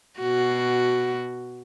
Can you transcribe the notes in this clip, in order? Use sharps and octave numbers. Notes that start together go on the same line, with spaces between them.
B2 F#4